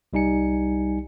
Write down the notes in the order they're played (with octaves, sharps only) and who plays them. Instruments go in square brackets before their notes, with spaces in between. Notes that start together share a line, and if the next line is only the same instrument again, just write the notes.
[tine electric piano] C2 G3 D#4 G#5 C#7